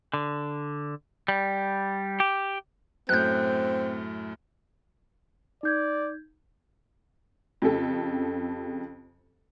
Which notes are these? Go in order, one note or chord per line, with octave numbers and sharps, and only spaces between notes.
D3
G3
G4
F#2 A2 C4 F#6 G6
D#4 D5 G6 G#6
F2 C#3 G4 A4